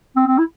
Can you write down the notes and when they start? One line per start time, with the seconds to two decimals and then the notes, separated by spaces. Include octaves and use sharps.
0.16 C4
0.27 C4
0.38 E4